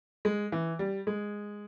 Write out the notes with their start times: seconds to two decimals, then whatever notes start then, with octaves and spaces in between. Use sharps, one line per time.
0.25 G#3
0.52 E3
0.79 G3
1.07 G#3